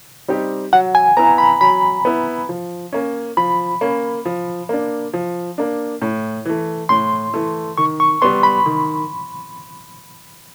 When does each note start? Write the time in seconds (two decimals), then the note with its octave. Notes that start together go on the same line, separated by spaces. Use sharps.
0.28 G3 C4 D#4 G4
0.73 F#3 F#5
0.95 G#5
1.17 B3 E4 A#5
1.38 B5
1.61 F#3 B5
2.05 B3 E4
2.49 F3
2.93 A#3 C#4
3.37 F3 B5
3.81 A#3 C#4
4.25 F3
4.69 A#3 D4
5.13 F3
5.58 A#3 D4
6.02 A2
6.45 E3 A3
6.89 A2 C6
7.34 E3 A3
7.78 D#3 C#6
8.00 C#6
8.22 G3 B3 C6
8.43 B5
8.66 D#3